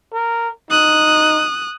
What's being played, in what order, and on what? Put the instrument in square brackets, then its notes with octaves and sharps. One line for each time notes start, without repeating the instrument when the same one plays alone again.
[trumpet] A#4
[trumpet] D#4 [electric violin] D#6 F#6